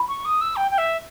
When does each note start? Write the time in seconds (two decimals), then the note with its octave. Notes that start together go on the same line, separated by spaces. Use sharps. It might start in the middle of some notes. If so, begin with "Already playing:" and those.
Already playing: B5
0.08 C#6
0.25 D#6
0.41 E6
0.56 G5
0.71 G5
0.78 E5